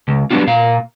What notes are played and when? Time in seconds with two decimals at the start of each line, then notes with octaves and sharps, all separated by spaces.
0.08 C#2
0.31 F#3 G3 B3 C4 D4 F4
0.47 A#2 F5